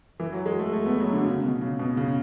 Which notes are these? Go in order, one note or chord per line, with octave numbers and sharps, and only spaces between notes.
E3
F#3
G#3
A3
A3
B3
F#3
D3
C#3
B2
C#3
B2
C#3